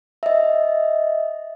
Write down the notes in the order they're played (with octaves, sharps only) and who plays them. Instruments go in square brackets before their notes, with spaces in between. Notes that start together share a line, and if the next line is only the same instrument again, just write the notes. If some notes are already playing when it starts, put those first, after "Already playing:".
[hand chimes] D#5 E5